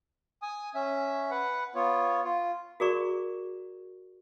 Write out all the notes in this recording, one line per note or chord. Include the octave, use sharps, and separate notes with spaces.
G#5 D#6
C#4 E5
B4 F#5
B3 F4 C#5
F4
F#4 G#4 A#4 D5 A#5 C#6